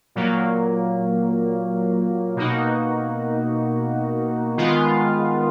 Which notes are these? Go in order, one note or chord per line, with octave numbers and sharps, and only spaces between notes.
A#2 F#3 A#3
B2 A#3 D#4 F#4
D#3 G#3 B3 F4